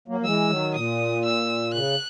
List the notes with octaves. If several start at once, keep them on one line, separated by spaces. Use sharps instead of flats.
F#3 A#3
F#3
E3 G#3 E6
D#3 F#3
A#2 D#6
E6
C#3 F#6